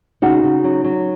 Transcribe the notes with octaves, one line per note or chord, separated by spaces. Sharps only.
C#3 D#4 F#4
C#3
F#3
F#3